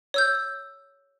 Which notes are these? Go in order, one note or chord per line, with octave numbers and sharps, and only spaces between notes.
C#5 E6 G6